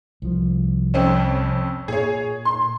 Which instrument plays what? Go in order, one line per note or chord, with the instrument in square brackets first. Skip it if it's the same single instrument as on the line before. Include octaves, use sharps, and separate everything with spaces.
[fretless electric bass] C2 F3
[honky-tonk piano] F2 C4 C#4
[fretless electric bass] A#2 [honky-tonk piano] G#4 C#5
[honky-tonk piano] C6